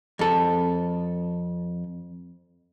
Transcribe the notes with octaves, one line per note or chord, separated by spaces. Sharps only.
F2 A4